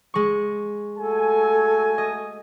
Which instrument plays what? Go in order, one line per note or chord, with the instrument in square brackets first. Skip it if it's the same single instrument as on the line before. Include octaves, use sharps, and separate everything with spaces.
[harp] G#3 C#6
[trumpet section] A3 F#4 G#5 [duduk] A4
[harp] D#5